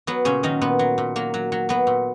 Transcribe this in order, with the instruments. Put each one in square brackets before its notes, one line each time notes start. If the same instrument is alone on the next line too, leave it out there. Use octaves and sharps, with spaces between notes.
[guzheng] F#3 B3
A#2 C#3 C#4
D#3 F#3 D#4
A#2 B3
F#3
A#2
F#3 A#3
F#3
F#3
F#3 B3
A#2